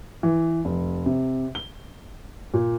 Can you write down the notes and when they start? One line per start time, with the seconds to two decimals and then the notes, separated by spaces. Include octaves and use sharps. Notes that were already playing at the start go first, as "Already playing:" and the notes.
0.23 E3
0.65 F1
1.06 C3
1.55 G7
2.54 A#2